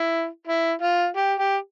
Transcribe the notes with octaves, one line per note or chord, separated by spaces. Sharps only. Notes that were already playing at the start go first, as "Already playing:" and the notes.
Already playing: E4
E4
F4
G4
G4